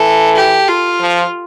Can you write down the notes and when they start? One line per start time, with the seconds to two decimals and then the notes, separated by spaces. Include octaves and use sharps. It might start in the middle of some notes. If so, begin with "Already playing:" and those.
Already playing: E3 A4
0.36 G4
0.68 F4
1.01 F3